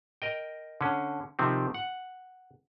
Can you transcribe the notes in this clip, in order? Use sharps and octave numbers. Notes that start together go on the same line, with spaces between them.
A#4 D#5 G5
D3 C#4
C3 D#3 F3 C4
F#5